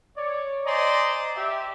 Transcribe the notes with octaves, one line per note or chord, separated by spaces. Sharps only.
C#5 D5
C5 D5 D#5 G#5 A#5 C6
G4 E5